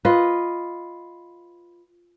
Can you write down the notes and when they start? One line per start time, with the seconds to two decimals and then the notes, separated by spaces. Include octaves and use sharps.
0.05 F4 B4 D#5